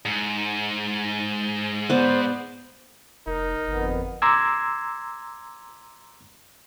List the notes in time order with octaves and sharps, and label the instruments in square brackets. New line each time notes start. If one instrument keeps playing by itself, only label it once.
[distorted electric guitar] G#2
[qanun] B3 D5 [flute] C5
[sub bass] F1 [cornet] D#4 [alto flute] A#4
[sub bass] G1 [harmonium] F2 B3
[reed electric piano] A#5 C6 D6 E6 G#6